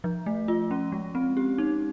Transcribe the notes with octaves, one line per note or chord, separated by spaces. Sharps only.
F3
A3
F4
C#4
G#3
C4
G4
D#4